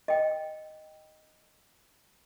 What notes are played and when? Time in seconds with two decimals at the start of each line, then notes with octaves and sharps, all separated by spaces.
0.08 D#5 G5